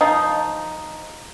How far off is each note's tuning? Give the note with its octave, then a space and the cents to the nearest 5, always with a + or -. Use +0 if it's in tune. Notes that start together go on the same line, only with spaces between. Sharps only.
F3 +0 D#4 +0